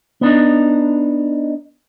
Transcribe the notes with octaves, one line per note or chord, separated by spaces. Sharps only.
B3 D4 D#4